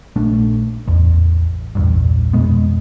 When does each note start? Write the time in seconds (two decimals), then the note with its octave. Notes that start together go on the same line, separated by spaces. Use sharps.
0.16 A#1 A3 D4
0.87 A1 E2
1.75 A#1 E2 G2
2.33 F2 B2 G#3 B3